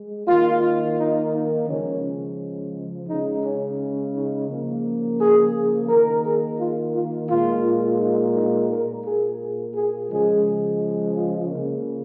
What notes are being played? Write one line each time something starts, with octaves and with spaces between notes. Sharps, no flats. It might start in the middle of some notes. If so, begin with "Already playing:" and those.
Already playing: G#3
D#3 A#3 F4
D#4
D#4
C#3 F3 G#3 C#4
C#3 G#3 D#4
C#4
D#4
C#3 F3 A#3
G#4
D#3 A#3 A#4
G#4
F4
F4
A#2 G#3 F4
D#4
D#4
A#2 A#3 A#4
G#4
G#4
C#3 F3 G#3 G#4
F4
C#3 A#3